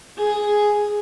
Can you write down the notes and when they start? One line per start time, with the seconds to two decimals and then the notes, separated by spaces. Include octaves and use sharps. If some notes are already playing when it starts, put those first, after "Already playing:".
0.18 G#4